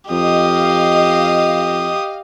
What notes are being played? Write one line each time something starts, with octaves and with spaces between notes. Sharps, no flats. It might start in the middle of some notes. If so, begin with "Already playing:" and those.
F2 G4 D#5 F5 D#6